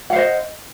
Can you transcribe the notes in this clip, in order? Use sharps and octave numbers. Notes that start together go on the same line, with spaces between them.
C5 D#5 F5 F#5